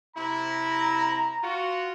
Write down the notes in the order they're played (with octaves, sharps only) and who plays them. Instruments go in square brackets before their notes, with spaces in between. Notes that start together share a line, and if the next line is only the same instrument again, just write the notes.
[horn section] C3 E4 [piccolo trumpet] A#5
[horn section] F4 F#4